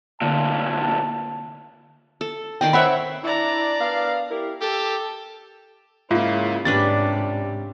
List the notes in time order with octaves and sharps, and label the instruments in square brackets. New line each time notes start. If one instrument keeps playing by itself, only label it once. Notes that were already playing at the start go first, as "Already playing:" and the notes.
[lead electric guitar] D2 A#2 [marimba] D3 [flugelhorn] A5
[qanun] A4
[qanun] D#3 D5 D#5 [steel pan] G5
[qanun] C4 C#5 E5 [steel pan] F#5 B5
[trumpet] D4 [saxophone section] E4 [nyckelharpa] D5 A#5
[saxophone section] B3 A#4 F5
E4 G4 A#4
[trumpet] G4 [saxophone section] A4 [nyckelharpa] A5
[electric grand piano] G#2 A#3 [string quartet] C#3 E4 [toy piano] F4 E5 F5
[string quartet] G#2 C3 G3 [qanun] C#4 D4 B4 [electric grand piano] A6